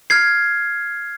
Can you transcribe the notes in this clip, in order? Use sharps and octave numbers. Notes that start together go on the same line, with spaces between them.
F6 G#6 C7